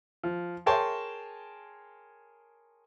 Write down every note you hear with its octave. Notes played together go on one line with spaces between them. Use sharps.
F3
G#4 A#4 C#5 G5 A5 C6